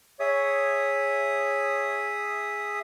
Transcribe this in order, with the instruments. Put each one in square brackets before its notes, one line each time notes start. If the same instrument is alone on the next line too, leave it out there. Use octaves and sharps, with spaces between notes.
[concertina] G#4 E5 D#6 [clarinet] C#5